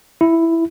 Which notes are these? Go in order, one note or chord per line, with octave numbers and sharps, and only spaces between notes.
E4